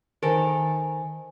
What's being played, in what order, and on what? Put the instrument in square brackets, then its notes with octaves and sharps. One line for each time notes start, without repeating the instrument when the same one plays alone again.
[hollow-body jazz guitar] D#3 A4 A#4 [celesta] C5 G#5